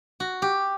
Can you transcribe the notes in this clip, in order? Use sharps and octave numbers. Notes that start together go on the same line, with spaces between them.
F#4
G4